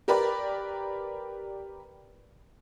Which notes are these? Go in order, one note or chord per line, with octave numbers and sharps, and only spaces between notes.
G4 A#4 B4 D5